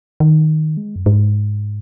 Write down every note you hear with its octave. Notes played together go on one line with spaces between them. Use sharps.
D#3
G#3
F#2
G#2